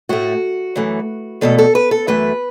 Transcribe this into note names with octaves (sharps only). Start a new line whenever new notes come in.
A2 A3 F#4
F#2 E3 A3
E2 B2 A3 A4
A4
B4
A4
F#2 E3 A3 B4